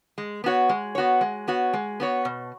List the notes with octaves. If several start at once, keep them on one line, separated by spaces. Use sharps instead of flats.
G#3
B3 F#4 C#5
G#3
B3 F#4 C#5
G#3
B3 F#4 C#5
G#3
B3 F#4 C#5
B2